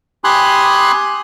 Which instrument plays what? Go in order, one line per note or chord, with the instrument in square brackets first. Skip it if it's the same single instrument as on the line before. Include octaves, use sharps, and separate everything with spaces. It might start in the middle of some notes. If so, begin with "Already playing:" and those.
[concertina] G4 G#5 B5 C6 D#6 F#6